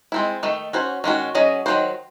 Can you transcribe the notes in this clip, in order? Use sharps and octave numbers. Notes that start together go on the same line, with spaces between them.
G#3 C4 E4
D#3 A3 D#4 A4
C#4 F#4 C5
D#3 G#3 C#4 F#4
F#3 C#4 G#4 D#5
D#3 F#3 C4 F#4 C5